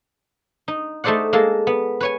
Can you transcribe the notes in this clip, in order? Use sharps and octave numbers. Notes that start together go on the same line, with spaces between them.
D#4
A3 D#4 A4 C5 D5 F#5
G#3 A#3 A4
B3
B4 C#5 G#5